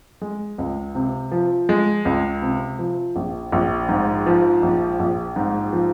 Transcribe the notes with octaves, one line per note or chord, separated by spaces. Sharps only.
G#3
C#2
C3
F3
G#3
C#2
C3
F3
A#1
A#1
G#2
F3
A#1
A#1
G#2
F3